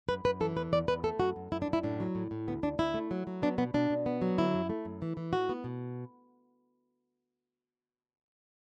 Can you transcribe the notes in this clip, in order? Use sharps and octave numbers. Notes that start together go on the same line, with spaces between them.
F#2 B4
F#2 B4
E3 A4
E2 B4
E2 D5
E2 B4
A3 A4
F#2 F#4
F#2
F#2 E4
D4
F#2
E4
A2 D4
F#3
A2
A2
D2 B3
D2 D4
D2 E4
A3
F#3
F#3
B3 D4
B2 B3
B2 D4
B2
B3
F#3
D3 E4
F#2
A3
F#2
E3
E3
A2 F#4
B3
B2